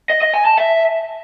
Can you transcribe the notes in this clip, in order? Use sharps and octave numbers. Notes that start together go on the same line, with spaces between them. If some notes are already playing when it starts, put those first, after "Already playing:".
D#5
D#5
G#5
A5
E5